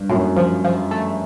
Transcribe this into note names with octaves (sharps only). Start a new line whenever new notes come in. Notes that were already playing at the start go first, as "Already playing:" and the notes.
Already playing: G2
F#2 A2
F3
F3
A3